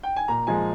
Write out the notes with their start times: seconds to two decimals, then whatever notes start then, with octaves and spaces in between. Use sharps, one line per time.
0.03 G5
0.16 G#5
0.28 A#2 A#5
0.47 F3 G#3 G#5